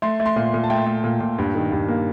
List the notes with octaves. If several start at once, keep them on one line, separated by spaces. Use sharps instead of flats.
A3 C6
A3
C6
A#2
A#2
A5
A3 G5
A3
A#2
A#2
G2
D#3
G2
A#3